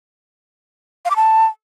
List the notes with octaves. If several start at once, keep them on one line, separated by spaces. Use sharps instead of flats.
F5
D6
A5